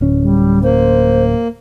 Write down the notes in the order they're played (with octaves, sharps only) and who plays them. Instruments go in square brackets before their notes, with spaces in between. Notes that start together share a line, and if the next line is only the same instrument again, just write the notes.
[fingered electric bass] D1 C#4
[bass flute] G3
[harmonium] A#3 [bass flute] C5